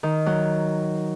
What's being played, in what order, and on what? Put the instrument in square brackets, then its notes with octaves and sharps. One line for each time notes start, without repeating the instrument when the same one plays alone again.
[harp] D#3
F#3